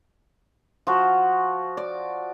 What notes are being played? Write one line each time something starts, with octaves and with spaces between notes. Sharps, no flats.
F3 F#4
D5